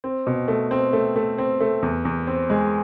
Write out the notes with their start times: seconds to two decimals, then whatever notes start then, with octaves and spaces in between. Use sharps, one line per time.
0.04 C4
0.27 B2
0.48 A3
0.71 C4
0.93 A3
1.16 A3
1.38 C4
1.60 A3
1.82 E2
2.05 E2
2.27 C4
2.50 G#3